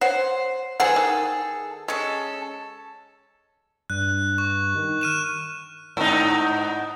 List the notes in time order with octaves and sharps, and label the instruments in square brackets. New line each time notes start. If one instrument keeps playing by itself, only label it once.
[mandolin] C5 [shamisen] C#5 F#5
[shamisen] E3 C5 F#5 [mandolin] G#4 A4
[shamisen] D#3
[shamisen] G#3 [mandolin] C#4 A4
[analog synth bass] G2 [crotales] F#6
[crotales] C#6
[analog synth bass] D#3
[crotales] F6 D#7 E7
[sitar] G#2 D#4